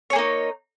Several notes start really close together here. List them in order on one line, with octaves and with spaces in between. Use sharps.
C#5 G#4 A#3 D#4